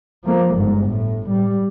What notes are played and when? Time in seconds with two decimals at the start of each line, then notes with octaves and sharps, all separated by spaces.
0.24 F3 A#3
0.56 G1 G#2
0.85 A2
1.29 G3